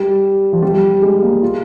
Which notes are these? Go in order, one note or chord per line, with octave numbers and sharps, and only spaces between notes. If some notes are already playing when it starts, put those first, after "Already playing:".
Already playing: G3
F3
G3
G#3
A#3
F4